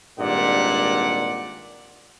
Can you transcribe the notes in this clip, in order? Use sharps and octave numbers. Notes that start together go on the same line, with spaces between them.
G#1 G2 A#2 D5 F#5